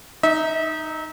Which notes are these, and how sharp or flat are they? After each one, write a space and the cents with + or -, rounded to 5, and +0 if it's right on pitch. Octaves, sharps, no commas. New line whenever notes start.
D#4 -5 E5 -35